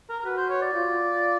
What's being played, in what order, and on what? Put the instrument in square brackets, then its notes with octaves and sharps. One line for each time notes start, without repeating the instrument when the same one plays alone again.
[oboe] A#4
A#4
[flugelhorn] F#4 [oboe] B4
[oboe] C5
C#5
D5
[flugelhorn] F4